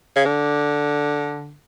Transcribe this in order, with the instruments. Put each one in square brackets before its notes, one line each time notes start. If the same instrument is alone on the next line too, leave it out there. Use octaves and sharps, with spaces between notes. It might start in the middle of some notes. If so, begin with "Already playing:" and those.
[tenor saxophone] C#3
D3